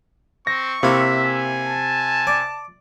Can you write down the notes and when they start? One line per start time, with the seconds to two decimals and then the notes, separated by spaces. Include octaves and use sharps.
0.47 C4 C#6 A#6
0.83 C3 A#3 E4 E5
1.25 G#5
1.65 A5
2.27 D5